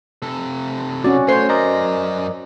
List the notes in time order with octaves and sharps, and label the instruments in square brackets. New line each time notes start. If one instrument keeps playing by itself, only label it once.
[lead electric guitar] C3 A4
[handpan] C#4 F#4 [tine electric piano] D5
[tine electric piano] A3 C6 C7 [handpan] C5 [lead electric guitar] C#5
[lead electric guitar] F#2 A#5 [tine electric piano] A#4 D5 D#5